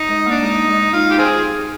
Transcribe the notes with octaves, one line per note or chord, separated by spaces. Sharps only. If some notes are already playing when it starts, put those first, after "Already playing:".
Already playing: D#4
G#3
A#3 D4
G#3 D#4
G#3
D#4 F4
G4
C4 F4 G#4